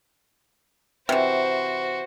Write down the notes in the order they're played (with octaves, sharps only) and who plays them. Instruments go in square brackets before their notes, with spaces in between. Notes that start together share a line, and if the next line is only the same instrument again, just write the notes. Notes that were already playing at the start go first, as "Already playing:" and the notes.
[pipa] C3 E3 [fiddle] F#4 C5